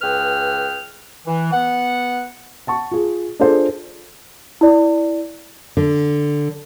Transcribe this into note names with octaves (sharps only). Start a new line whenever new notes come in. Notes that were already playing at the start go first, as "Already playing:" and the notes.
C#2 G#4 B4 G5 F6
E3
B3 F#5
F#5 A5 C#6
F4 G#4
D4 F4 G#4 A4 C5
E4 D5
D3